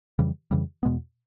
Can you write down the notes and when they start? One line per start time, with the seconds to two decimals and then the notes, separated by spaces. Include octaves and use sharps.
0.19 F2 C#3 E3 G3
0.51 F2 C#3 E3 G3
0.83 E2 B2 G#3 B3